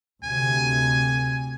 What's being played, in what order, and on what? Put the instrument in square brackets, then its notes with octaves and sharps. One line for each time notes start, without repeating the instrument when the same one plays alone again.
[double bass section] D2 C3 [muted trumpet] G#5